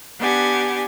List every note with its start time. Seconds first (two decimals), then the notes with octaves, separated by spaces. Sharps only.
0.19 B3 D4 G4 F#5 G#5